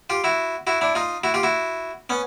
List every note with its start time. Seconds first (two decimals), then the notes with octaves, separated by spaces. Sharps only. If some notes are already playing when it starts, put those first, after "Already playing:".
0.10 F4 G4
0.24 E4 F#4
0.67 E4 F#4
0.81 D4 E4
0.95 D#4 F4
1.24 E4 F#4
1.34 F4 G4
1.43 E4 F#4
2.10 B3 C#4